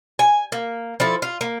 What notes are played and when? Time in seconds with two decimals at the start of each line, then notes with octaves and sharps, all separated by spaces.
0.19 G#5
0.52 A#3
1.00 F3 E4 A4
1.22 F4
1.41 A#3